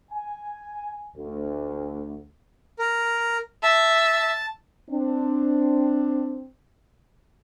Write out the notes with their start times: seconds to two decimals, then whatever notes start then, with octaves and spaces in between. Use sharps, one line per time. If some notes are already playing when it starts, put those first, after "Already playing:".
0.11 G#5
1.16 D2
2.79 A#4
3.63 E5 A5
4.90 C4 D4